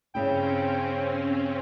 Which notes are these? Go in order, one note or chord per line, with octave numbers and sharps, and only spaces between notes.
G2 C#3 C4 C#4 E4 G5